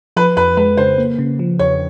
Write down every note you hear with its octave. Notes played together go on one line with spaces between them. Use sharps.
F3 B4
F2 B4
G#3 B4
C#3 C5
A#3
C#3
F3
E2 C#5